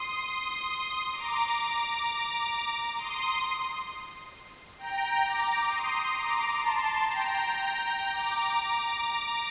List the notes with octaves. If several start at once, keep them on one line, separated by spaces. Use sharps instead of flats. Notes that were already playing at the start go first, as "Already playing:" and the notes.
Already playing: C6 D#6
A#5 D6
C6 D#6
G5 A#5
A#5 D6
C6 D#6
A#5 D6
A5 C6
G5 A#5
G5 A#5
G5 A#5
A#5 D6